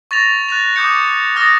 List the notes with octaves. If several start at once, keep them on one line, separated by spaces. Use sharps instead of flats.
C#6 A6 A#6 F7
F#6 A6 F7
D6 D#6 G6 C#7
D6 D#6 F6 A6 A#6